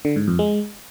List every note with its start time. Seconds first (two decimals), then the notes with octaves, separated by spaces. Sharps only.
0.05 D3
0.16 G#2
0.28 F2
0.39 G#3